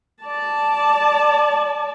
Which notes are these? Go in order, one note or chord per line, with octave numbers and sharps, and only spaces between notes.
D5 A5